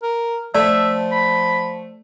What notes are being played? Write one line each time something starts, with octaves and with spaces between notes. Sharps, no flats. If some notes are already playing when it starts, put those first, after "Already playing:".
A#4
F3 A3 D5 E5
B5